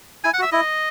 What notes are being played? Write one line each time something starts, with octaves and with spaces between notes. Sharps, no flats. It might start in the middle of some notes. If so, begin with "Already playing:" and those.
E4 G#5
F#5
F#4
E5
E4 D#5